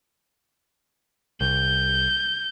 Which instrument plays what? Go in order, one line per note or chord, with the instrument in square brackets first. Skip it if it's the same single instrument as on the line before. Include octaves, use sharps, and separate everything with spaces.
[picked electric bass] C2 [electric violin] G6